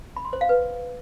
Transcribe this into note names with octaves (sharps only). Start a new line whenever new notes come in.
B5
C6
C5
F5
B4